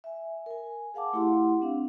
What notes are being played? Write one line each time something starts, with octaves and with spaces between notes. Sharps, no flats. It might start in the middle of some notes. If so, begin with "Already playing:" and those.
E5 G#5
A#4 G#5
G#4 F5 F#5 A5 D6
A3 E4 G4 F#5 C6
C4 D4 F5